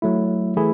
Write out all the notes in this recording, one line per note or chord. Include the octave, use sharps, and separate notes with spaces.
F#3 A3 E4
E3 A3 E4 G#4